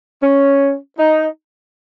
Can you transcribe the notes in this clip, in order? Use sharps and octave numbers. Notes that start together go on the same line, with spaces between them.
C#4
D#4